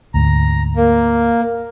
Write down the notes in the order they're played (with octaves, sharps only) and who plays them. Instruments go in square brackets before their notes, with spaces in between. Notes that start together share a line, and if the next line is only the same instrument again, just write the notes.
[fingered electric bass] D2 G#2 [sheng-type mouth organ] A#5
[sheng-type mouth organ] A#3